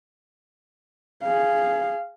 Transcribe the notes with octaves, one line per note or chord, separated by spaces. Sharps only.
G#4 F5